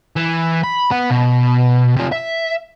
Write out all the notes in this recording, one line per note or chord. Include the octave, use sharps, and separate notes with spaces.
E3
B5
B3 F#5
B2
C3 F4
E5